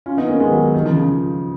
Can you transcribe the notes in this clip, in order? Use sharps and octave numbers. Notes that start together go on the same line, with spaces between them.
C#4 F4
B3 D#4
A#3 C#4
G#3 B3
D#3 F#3
D#3
C#3 F3
C#3 F3